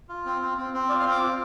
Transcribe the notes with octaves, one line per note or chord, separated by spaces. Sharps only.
F4
C4
C4
C4
C4
F4 D5
F5
C4
D6
F4